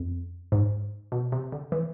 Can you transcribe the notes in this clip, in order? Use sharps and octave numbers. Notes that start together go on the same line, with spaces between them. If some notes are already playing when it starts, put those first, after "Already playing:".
Already playing: F2
G#2
B2
C3
D3
E3